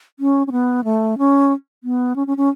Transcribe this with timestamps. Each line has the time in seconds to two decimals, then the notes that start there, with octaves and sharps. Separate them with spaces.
0.19 C#4
0.47 C#4
0.52 B3
0.84 A3
1.18 C#4
1.84 B3
2.16 C#4
2.27 C#4
2.37 C#4